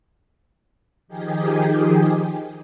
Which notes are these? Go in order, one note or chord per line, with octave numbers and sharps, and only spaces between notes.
D#3 F3 D#4 G4 G#4